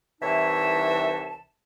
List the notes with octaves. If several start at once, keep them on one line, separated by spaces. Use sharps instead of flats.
C2 E3 D#4 C#5 E5 A5